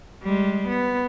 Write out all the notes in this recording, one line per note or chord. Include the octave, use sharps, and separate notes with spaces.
G3 G#3
B3